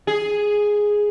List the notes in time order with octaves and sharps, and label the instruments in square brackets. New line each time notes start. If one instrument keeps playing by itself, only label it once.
[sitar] G#4